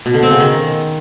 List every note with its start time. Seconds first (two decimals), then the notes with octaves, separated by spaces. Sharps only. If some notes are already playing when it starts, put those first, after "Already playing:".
0.06 B2
0.14 D3
0.23 C4
0.31 C#3
0.40 D#3